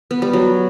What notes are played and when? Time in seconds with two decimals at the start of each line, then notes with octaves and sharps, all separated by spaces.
0.11 B3
0.22 G3
0.33 F#3